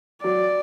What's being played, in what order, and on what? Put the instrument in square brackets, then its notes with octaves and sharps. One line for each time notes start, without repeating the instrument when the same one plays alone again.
[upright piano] F#3 [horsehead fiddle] D5